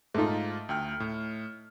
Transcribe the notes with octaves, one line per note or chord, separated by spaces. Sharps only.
G#2 A3 D#4 F4
D2 G5 F6
A2